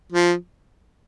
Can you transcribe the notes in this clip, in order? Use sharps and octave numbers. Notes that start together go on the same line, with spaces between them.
F3